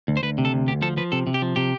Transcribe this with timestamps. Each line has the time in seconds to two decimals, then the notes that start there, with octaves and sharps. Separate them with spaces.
0.08 D2
0.17 C5
0.23 D2 B4
0.38 C3
0.45 A4
0.53 D2
0.67 D2 G4
0.82 F3 A4
0.97 F3 B4
1.12 C3 A4
1.27 C3
1.34 G4
1.42 F3
1.56 C3 G4